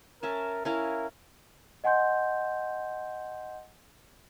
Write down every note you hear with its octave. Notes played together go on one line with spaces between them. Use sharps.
C#4 A#4 E5 A5
C#4 E4 A#4 F5
D#5 F#5 G#5 C6 G6